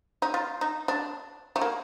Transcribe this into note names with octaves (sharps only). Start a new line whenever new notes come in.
D#4
F4
D#4
D4
A3
A#3